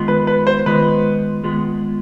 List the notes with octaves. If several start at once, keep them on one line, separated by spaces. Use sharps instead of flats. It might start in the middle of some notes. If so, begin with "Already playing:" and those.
Already playing: D#3 G#3 B3 F4 G#4
B4
B4
C5
D#3 G#3 B3 F4 G#4 B4
D#3 G#3 B3 F4 G#4